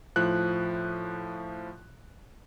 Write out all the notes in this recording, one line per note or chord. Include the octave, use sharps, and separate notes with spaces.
A2 F3 F#6